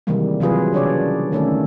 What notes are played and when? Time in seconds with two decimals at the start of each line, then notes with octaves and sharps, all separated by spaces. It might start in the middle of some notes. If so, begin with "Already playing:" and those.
0.07 C3 D#3 E3 G3 G#3 A#3
0.40 C3 E3 F#3 F4 G#4 B4
0.73 C#3 D4 C#5 D5
1.32 D3 D#3 A3 C#4 D#4 A4